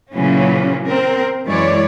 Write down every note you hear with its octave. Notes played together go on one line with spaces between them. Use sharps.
A#2 C#3 E3 F#3 C#4
C4 A#4
F#2 E3 G#3 C#5 D5